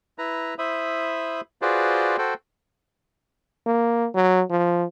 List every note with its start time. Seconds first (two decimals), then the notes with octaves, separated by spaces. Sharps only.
0.18 E4 B4 A#5
0.59 E4 C5 E5 B5 D#6
1.62 F4 F#4 G#4 B4 C5 D5
2.18 F#4 A4 C5 G5
3.66 A#3
4.15 F#3
4.50 F3